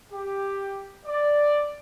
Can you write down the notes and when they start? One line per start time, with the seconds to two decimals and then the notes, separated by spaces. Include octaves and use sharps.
0.12 G4
1.05 D5